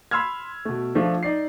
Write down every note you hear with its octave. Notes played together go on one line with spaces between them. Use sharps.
B5 C6 E6 F6 G#6
B2 A3
F3 A3 D4 F4
D#4 D5 C7